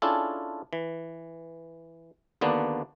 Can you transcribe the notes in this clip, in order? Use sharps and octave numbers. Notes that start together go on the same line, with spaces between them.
C#4 D4 E4 F4 G#4 A4
E3
D#2 D3 A#3 B3 D4